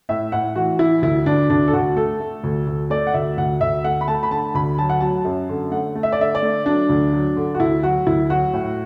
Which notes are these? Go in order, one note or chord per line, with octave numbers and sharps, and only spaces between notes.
A2 E5
A2 F#5
E3 F#4
E3 E4
D2 E4
D2 D4
D2 D4
A4
D2 F#4
A3 A4
A3
D2
D2
A3 D5
F#5
D2 E5
D2 F#5
D2 E5
A3 F#5
B5
A3 A5
B5
D3 A5
D2 B5
F#3 A5
F#5
F#3 A5
F#2
D3
A3 F#5
A3
E5
D5
D3 E5
D5
A3
F#3 D4
D2
F#3
D3
F#4
D2 E4
F#3 F#4
D2 E4
F#3 F#4
A2